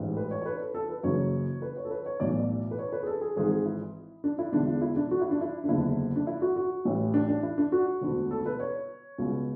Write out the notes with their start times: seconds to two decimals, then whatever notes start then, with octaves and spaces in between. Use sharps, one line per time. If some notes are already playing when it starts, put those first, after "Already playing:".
Already playing: A1 G#2 E3
0.17 B4
0.31 C#5
0.42 C#5
0.46 B4
0.60 A4
0.74 A4
0.89 B4
1.03 F#1 F#2 C#3 E3 C#5
1.62 B4
1.77 C#5
1.85 A4
1.91 B4
2.06 C#5
2.20 B1 A2 E3 D5
2.40 D5
2.71 B4
2.79 C#5
2.92 B4
3.03 G#4
3.07 A4
3.21 G#4
3.36 G#1 G#2 E3 G#4
3.51 G#4
3.65 E4
4.24 D4
4.39 E4
4.52 E1 E2 D3 D4
4.67 E4
4.82 E4
4.96 D4
5.11 F#4
5.21 E4
5.31 D4
5.41 E4
5.64 D4
5.68 F#1 E2 D3 E4
6.16 D4
6.27 E4
6.42 F#4
6.56 F#4
6.85 A1 A2 E3
7.14 D4
7.28 D4
7.43 E4
7.58 D4
7.72 F#4
8.01 E1 D2 D3
8.31 A4
8.46 B4
8.60 C#5
9.18 C#2 B2